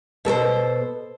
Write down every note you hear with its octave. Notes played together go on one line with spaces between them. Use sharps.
B2 A4 A#4 C5